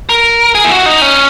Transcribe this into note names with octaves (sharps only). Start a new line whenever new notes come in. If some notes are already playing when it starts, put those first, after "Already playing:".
A#4
G#4
E4
F#4
D#4
C#4